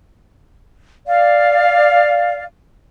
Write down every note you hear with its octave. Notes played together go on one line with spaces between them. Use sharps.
D5 F5